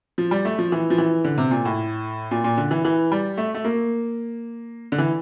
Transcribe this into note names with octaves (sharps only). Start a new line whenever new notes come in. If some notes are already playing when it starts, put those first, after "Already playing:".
F3
G3
A3
F3
E3
F3
E3
D3
C3
A#2
A2
A#2
A#2
D3
E3
E3
G3
A3
A3
A#3
D3
E3